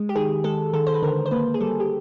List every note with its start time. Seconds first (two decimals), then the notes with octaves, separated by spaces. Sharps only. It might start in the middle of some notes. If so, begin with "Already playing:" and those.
Already playing: G#3
0.09 G4
0.15 D#3 G#4
0.44 G#3 A4
0.73 D#3 A4
0.87 C5
0.94 B4
1.02 D3 A#4
1.26 C5
1.31 A#3 B4
1.54 G#4
1.60 G3 A4
1.80 G4